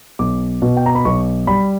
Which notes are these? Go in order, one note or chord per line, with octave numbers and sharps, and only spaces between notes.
B1 D6
B2
G5
A#5
B5
B1 C#6
G3 B5